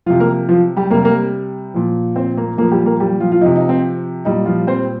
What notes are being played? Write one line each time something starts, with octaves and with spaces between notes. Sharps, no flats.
C3 F3 F4
A#3 A#4
F3 F4
G3 G4
C3 G3 A#3 A#4
A#3 A#4
A#2 F3
C4 C5
A#3 A#4
A#2 F3 A#3 A#4
G3 G4
A#3 A#4
G3 G4
F3 F4
F4
C3 F3 D#4
D#4
C4
A#2 G3 D#4
F3 F4
C4 C5